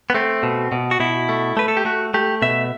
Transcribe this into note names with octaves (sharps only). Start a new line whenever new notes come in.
B3
A3 C4
B2
B2
F#4
B2 E4
A3
A3 B4
A4
G4
A3 F#4
A3 G4
B2 E5